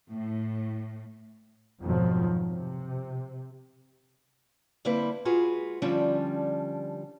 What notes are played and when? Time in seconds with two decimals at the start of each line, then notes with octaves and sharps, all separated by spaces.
0.10 A2
1.81 F2 G#2 B2 D#3 F3 F#3
2.49 C3
4.85 D3 G3 A#3 C4 E4 B4
5.25 G#3 F4 F#4 G#4 B4
5.82 D3 F3 G3 C#4 D4